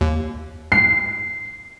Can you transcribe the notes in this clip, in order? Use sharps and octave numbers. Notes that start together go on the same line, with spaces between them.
D#2
C7